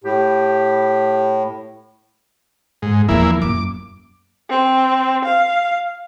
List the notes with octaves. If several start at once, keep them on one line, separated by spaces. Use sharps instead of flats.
A2 G4
G#2
E2 D3 F3 A#3 E4
F#2 A#3 D6
C4
F5